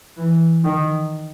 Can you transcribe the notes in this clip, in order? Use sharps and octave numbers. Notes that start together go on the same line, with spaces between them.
E3
D#3